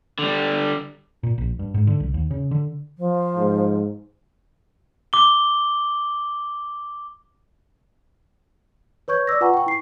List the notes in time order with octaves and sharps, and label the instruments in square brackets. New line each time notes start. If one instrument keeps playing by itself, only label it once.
[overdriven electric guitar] D3 G3
[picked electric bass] A#2
A#1
G2
G#2
D3
C2
D#2
C#3
D3
[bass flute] F3
[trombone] G#2
[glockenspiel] D6 G7
[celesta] B4 C#5 C#6 G6 G#6
D5 D6 E6 A#6
F4 B4 F#5 G#5 A#5 C#6
G5 C#6
E4 C7